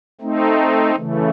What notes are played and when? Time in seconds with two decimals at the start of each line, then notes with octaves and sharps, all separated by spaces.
0.21 A3 C4 D#4
0.95 C#3 E3 A3